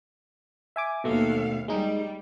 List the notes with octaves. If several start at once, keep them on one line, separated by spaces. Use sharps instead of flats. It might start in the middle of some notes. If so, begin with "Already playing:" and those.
E5 G#5 D6
D#2 B2 A3 F5
G3 G#3 D#4